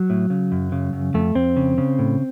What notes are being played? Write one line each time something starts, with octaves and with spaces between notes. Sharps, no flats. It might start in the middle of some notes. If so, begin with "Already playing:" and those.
Already playing: F#3
A2
C#3
F#2
C#3
F#2
F2 A3
F2 C4
C#3
C#3
A2